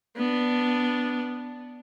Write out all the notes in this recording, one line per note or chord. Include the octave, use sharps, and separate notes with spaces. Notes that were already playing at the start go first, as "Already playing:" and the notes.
B3 D4